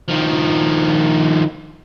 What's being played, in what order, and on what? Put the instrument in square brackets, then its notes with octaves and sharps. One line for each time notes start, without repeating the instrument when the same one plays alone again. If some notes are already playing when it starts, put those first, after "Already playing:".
[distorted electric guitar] D#3 F3